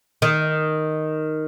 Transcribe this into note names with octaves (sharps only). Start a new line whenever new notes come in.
D#3